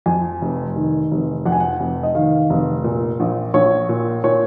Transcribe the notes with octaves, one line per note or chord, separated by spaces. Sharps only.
F2 G#5
F1
D#3
F1
F2 F#5
G#5
F#5
F1
D#5
D#3 F5
F1
A#2
A#1
A#1 C#5
A#2
A#2 C#5